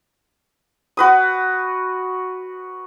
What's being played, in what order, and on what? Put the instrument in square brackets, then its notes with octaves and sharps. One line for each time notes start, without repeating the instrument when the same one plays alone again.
[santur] F#4 B4 D#6